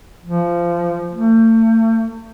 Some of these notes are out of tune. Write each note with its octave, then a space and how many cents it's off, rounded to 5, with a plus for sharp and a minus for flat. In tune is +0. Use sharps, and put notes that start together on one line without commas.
F3 -20
A3 +40